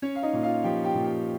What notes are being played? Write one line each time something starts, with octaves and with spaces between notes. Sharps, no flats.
C#4 C#5
F5
D#4 D#5
A#2
F4 F5
F3 G4 G5
G4 G5
A#2
G4 G5